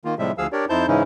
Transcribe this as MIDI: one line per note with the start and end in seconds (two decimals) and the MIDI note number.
0.05 0.15 51
0.05 0.15 58
0.05 0.15 65
0.19 0.32 45
0.19 0.32 48
0.19 0.32 53
0.19 0.32 55
0.19 0.32 56
0.19 0.32 76
0.38 0.47 38
0.38 0.47 53
0.38 0.47 68
0.38 0.47 77
0.38 0.47 88
0.52 0.65 62
0.52 0.65 67
0.52 0.65 70
0.52 0.65 73
0.52 0.65 74
0.69 0.86 41
0.69 0.86 63
0.69 0.86 64
0.69 0.86 72
0.69 0.86 81
0.69 0.86 91
0.87 1.03 44
0.87 1.03 49
0.87 1.03 52
0.87 1.03 61
0.87 1.03 63
0.87 1.03 64